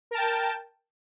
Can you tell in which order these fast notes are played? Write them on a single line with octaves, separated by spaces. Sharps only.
A#4 A5 G5